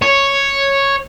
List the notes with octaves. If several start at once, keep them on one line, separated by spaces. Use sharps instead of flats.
C#5